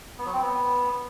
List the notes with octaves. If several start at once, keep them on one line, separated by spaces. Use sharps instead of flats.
B3
F#3
C4
B3